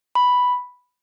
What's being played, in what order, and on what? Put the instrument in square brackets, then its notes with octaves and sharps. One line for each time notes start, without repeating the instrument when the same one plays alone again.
[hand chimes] B5